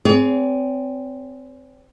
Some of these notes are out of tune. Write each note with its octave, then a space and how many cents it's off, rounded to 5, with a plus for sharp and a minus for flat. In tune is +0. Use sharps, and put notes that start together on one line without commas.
C4 -15 G#4 +0 C#5 +45